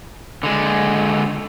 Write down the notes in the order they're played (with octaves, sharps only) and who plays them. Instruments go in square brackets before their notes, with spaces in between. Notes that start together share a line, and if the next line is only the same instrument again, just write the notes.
[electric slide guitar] D3 G#3